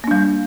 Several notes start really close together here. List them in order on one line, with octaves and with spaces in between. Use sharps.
A#3 D4 G3